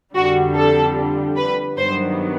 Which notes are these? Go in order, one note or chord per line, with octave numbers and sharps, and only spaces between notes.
F2 D3 G3 F#4
A4
B4
G2 D#3 F#3 B3 C5